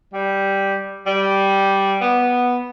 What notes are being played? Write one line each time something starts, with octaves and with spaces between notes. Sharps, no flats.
G3
G3
B3